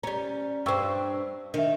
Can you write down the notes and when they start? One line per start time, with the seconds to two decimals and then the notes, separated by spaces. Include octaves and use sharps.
0.03 G3 C#4 A#5
0.66 G2 C4 G5 C#6 E6
1.54 D#3 D4 E5